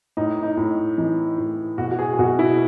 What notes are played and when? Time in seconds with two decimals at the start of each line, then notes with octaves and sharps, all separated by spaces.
0.17 A2 D#4
0.43 D#4
0.57 A2
0.98 E3 D#4
1.38 A2
1.78 B2 F#4
1.91 F#4
1.99 G#4
2.13 G#4
2.19 B2 F#4
2.39 E4